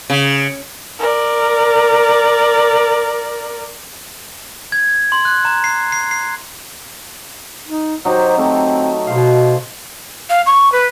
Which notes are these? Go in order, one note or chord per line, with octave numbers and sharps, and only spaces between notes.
C#3
A#4 D5
G#6
C6
F#6
A#5
C7
C7
C7
D#4
F#3 D#4 G4 C5
A3 C4
B2 C5 F5
F5
C#6
B4